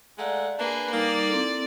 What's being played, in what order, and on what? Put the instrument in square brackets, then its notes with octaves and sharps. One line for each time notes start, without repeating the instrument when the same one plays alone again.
[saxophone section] G#3 A3 F#5 [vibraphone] D5 F5 A#5
[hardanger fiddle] A#3 G#4 [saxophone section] D4 B4
[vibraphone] G3 D#4 [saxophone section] A#3 [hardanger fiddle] D5
[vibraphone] C4 E4 A4